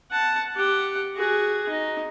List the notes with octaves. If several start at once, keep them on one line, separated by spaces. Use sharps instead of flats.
F#5 A5
G4 F#5
F#4 G#4
D#4